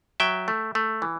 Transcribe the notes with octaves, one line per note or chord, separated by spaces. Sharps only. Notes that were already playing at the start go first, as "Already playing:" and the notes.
F#3 E5 G5
A3
A3
E3